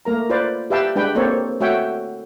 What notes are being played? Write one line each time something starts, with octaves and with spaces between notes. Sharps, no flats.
A3 A#3 A#4 A#5
F4 B4 C5 D5 F5
G4 B4 E5 F5 G5 A5
G#3 D4 B4 G5
A#3 C4 A4 C5 C#5
A3 F#4 C#5 E5 F#5 G5